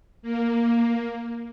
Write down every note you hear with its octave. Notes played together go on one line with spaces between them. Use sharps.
A#3